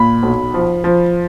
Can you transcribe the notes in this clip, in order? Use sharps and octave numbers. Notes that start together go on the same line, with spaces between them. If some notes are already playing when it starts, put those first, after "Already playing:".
Already playing: A#2 B5
B1
F3
F3